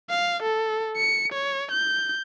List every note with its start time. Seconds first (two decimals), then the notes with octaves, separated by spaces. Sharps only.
0.10 F5
0.43 A4
0.97 C#7
1.33 C#5
1.71 G6